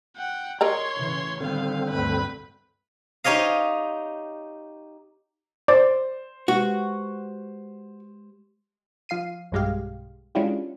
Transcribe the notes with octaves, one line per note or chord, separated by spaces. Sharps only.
F#5 G5
A#4 C#5 D#5 A#5 C6
A2 C#3 E3
D3 D#3 G3 B3 C4 F5
D2 G2 A3 B4 B5
D#4 G4 C#5 D#5 F5
C5 D5
G#3 F#4 G4 B4
F3 F5 C7 D#7
B1 G2 G#3 G4 F5
G#3 C#4 D4 E4 F4 G4